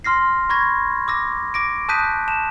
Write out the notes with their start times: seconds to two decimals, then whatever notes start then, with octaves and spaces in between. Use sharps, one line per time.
0.04 C6 F6 A#6 C7
0.49 B5 C#6 G#6 A#6
1.08 D6 E6 A#6
1.54 D6 A#6 D7
1.89 A5 D#6 F#6 G6 B6 D#7
2.28 A5 E7